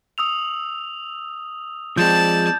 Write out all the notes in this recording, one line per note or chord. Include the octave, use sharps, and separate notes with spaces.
D#6 E6 F7
F3 G#3 C4 D5 A5 G6